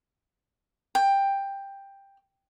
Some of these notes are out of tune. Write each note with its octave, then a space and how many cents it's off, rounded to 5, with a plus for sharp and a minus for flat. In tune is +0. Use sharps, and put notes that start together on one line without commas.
G5 +10